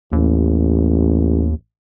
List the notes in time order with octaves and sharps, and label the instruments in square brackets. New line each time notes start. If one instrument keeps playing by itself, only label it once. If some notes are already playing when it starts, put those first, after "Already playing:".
[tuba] A1 [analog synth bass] D#2